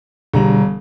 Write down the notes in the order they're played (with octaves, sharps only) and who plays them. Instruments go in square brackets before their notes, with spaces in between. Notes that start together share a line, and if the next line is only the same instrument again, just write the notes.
[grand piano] E1 A#5 [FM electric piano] D3 G3